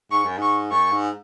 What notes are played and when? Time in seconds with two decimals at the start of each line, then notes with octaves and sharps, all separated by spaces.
0.11 G#2 C#6
0.25 F#2
0.38 G#2 C#6
0.71 F#2 C#6
0.92 G#2